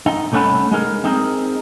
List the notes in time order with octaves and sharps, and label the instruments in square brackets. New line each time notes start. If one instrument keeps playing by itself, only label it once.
[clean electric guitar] D#4
C2 A3 C#4 C5 F#5 B5
G#3 D#4 A#4
C4 D#4 G#4 A#4